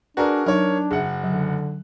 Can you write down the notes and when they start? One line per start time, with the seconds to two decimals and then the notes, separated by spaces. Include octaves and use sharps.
0.17 D4 F#4 G#4 A#4 B4 D5 A#5
0.46 F#3 D4 D#4 A#4 C#5
0.91 F#1 G#4 E5 F#5
1.23 D3 F#3